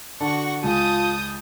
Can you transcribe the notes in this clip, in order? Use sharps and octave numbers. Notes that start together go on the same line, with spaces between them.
D3 D4 F#4 F#5 A5 C#6
C#2 G#3 F4 G#4 A5 D#6 G6